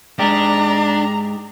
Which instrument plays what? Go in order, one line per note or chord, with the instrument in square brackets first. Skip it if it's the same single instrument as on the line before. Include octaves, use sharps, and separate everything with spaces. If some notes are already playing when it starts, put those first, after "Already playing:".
[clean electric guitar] G#2 G#3 G4 [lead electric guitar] D4 [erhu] A#5